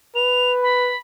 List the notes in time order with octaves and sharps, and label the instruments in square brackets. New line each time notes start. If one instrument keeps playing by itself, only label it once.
[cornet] B4 [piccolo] F7
[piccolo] B5